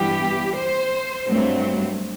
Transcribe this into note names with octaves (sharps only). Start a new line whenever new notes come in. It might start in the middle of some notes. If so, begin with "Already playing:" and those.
Already playing: G2 E3 G3 B3 G4
C5
G2 F#3 A3 C4